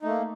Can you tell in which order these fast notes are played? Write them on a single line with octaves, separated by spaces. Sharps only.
D#4 A3 A#3